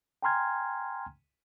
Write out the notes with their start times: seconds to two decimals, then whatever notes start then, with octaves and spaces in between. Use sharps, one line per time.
0.22 G5 G#5 A#5 C6 F6 G#6